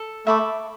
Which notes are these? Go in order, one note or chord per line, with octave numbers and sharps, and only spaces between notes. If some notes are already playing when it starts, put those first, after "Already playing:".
Already playing: A4
A3 E5 B5 D6